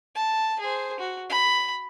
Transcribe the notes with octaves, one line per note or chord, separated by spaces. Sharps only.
A5
G#4 C5
F#4
B5